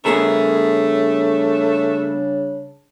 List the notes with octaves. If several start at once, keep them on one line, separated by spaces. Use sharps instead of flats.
C#3 G3 A3 B3 D4 G#4 A#4